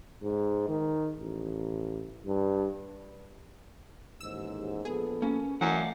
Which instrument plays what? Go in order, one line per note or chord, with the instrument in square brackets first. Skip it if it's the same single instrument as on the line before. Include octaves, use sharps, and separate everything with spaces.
[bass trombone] G#2
D#3
A1
G2
[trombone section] A1 D#2 G#2 [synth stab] E6
[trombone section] A#1 B3 A4 [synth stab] G#4
[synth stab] A#3 [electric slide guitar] C#4
[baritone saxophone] F#2 [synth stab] E3 [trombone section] A3 [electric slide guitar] D5 F5 F#5